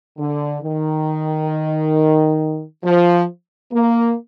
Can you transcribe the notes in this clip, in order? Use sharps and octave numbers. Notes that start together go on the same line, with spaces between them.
D3
D#3
F3
A#3